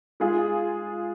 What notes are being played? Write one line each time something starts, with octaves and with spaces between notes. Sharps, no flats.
G#3 F4 G#4